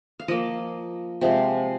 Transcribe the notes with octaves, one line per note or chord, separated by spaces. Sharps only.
F5
F3 A#3 D#5
C3 F3 G#3